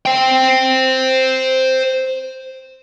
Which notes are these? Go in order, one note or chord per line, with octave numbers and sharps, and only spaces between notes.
C5 G5